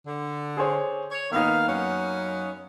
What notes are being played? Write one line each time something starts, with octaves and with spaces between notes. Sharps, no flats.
D3
G#4 C5 C#5
C#5
D#3 A#3 B3 D#4 F5
F#2 C#4 F#5